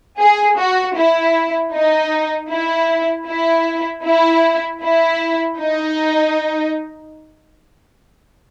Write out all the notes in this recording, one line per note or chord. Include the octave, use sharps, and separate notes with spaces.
G#4
F#4
E4
D#4
E4
E4
E4
E4
D#4